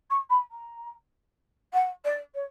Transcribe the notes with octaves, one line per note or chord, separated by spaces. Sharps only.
C#6
B5
A#5
F#5
D5
C#5